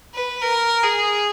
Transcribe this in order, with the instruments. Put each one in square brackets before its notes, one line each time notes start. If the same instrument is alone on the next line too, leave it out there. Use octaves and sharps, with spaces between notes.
[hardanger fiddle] B4
A#4
G#4